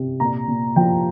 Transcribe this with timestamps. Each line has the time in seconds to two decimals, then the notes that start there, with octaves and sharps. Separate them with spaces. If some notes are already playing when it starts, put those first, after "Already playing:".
Already playing: C3
0.20 A#2 A#5
0.48 A#2
0.76 F3 G5